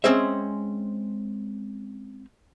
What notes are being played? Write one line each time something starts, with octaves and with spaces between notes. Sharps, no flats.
G#3 C4 C#4 G#4 C5 E5